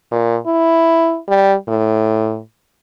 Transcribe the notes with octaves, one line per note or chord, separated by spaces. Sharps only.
A#2
E4
G3
A2